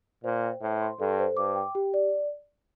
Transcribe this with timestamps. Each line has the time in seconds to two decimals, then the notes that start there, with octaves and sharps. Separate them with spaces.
0.24 A#2 C5
0.43 G5
0.62 A2 C5
0.81 C6
1.00 G2 A4
1.19 C5
1.37 G2 D6
1.56 G5
1.75 G4
1.94 D5